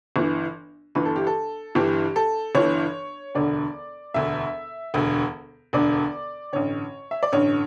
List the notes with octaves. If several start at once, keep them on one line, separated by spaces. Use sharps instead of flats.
G1 G2 E3
G1 G2 E3 B4
A4
G4
A4
G1 G2 E3 G4
A4
G1 G2 E3 C#5
E1 D2 D3 D5
E1 D2 D3 E5
E1 D2 D3
E1 D2 D3 D5
A1 G2 D3 C#5
E5
D5
A1 G2 D3 C#5